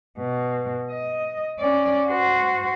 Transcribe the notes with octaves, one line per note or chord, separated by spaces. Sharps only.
B2
D#5
C#4 D5
F#4 C5